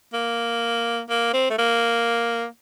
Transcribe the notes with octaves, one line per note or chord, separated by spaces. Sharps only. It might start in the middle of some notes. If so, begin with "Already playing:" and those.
A#3
A#3
C4
A3
A#3